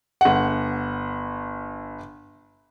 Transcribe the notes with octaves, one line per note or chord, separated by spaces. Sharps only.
G1 F#5